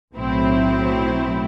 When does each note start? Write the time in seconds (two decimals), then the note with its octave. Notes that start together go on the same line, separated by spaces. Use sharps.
0.14 B1 A2 F#3 C4 E4